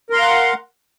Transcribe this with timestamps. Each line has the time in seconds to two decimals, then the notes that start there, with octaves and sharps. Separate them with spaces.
0.10 A#4
0.13 C6
0.16 A#5
0.19 F5
0.22 F#5